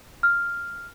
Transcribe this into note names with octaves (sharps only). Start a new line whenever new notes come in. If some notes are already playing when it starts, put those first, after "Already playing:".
F6